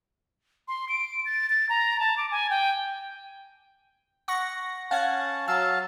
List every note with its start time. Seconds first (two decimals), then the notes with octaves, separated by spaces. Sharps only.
0.68 C6
0.89 D7
1.25 A6
1.50 A6
1.69 A#5
1.99 A5
2.17 D6
2.31 G#5
2.50 G5
4.28 F#5 C#6 A#6
4.91 C#4 F5 F#5 A5 G#6
5.48 F#3 F5 A5 E6